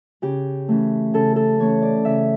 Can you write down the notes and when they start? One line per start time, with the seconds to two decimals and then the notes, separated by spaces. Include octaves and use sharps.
0.22 C#3 G4
0.68 E3 A3 C#4
1.13 C#3 A4
1.36 A4
1.59 E3 A3 C#4 C#5
1.82 D5
2.05 C#3 E5